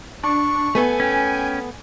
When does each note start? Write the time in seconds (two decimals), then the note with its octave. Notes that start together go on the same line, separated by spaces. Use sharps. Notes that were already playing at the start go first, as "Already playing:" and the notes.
0.23 D4 C#6
0.75 A3 B3 A4 G#5
1.00 C#4 G5